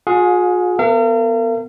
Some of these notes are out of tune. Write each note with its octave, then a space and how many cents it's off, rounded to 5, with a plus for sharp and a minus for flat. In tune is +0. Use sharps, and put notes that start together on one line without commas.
F4 +45 G#4 +10 F#5 -40
B3 +0 A#4 -40 F5 -40